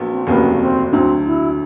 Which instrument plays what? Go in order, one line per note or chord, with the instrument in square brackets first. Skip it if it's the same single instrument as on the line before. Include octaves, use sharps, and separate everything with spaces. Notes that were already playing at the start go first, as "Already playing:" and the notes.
Already playing: [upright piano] A#1 A#2 F#3 B3
[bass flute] C4
[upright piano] F1 D#2 C#3 F#3 A#3 [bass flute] B3
[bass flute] C4
[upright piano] D2 D3 F#3 [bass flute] C4
[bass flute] E4